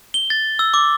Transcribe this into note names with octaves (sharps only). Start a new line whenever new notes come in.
G7
A6
E6
D6